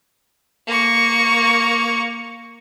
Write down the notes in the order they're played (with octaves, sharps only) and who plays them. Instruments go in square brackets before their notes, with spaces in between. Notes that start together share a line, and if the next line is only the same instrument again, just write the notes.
[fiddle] A#3 C#6